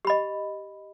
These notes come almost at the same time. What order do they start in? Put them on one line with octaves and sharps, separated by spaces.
G4 B5 D#5